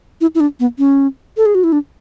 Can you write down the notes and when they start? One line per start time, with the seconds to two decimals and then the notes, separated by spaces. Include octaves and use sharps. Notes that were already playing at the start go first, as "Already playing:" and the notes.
0.21 E4
0.35 E4
0.40 D4
0.60 B3
0.78 C#4
1.37 A4
1.46 G#4
1.55 F#4
1.64 E4
1.72 D4